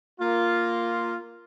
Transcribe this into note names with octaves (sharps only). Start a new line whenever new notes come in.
A#3 F4